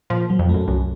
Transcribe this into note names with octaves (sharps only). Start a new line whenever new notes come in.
A#2 F3
F#3
F2
F#2 A3
C2 F#2